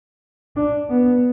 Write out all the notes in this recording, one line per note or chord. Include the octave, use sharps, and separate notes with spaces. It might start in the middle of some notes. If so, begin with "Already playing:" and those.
D4
B3